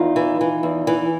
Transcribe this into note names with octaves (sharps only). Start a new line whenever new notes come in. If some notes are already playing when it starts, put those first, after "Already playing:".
Already playing: E2 D#4 F4
E3
E3
E2
E3